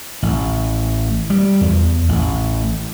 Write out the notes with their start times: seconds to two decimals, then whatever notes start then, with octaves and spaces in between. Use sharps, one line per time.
0.23 A1
1.30 G3
1.61 E2
2.09 A1